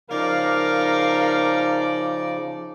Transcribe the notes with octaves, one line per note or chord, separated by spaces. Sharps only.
C#3 F3 D#4 A#4 D5 F5